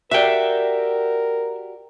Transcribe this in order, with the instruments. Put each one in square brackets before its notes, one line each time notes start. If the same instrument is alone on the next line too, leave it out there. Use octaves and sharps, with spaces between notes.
[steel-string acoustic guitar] F#4 G4 D5 [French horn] A#4 [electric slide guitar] E5 G5